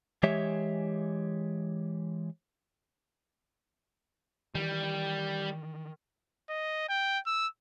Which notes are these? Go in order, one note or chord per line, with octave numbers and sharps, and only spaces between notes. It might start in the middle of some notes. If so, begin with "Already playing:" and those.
E3 G#3 G4 C#5 E5
D#3 E3 G3
D#5
G5
E6